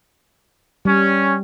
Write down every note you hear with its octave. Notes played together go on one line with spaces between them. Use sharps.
G3 C#4